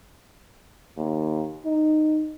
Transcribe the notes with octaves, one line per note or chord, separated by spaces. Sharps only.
D#2
D#4